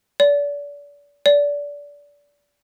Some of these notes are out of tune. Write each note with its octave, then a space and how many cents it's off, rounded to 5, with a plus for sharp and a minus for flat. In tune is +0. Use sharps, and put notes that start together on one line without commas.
D5 -35
D5 -25